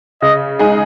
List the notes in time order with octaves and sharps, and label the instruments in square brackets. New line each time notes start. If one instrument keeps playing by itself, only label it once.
[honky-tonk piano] C#3 [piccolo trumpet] D#5
[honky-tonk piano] G#3 D#4 G#4